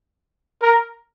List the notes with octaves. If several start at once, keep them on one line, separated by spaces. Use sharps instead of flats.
A#4